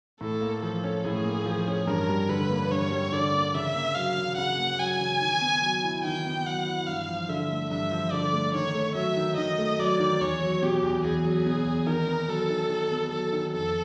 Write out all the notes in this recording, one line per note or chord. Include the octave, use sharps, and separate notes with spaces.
A2 A4
A#3
F3 A4
C#4
A2 G#4
A#3
F3
C#4
G2 A#4
G3
D3 B4
A#3
G2 C#5
G3
D3 D5
A#3
C#3 E5
A#3
F#3 F5
C#3
C#3 F#5
A#3
F#3 G#5
C#3
D#3
B3
F#3
E4
D#3 G5
B3
F#3 F#5
E4
G2 F5
F3
D3 E5
A3
G2 E5
F3
D3 D5
A3
D#3 C#5
A3
F#3 E5
D#3
D#3 D#5
A3
F#3 D5
D#3
E2 C#5
F#3
B2 G4
E2
E2 G#4
F#3
B2
E2
D#3 A#4
B3
F#3 A4
D#3
D#3
B3
F#3 A4
D#3
F2 A4